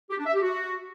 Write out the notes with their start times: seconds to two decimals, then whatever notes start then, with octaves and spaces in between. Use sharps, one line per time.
0.10 G4
0.18 D4
0.26 E5
0.34 G4
0.42 F#4